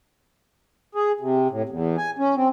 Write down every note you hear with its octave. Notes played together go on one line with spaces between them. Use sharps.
G#4
C3
A2
E2
G#5
C#4
C4